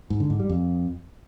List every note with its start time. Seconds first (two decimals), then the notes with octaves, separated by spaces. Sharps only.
0.10 G#2
0.20 D3
0.30 G#2
0.40 G3
0.49 F2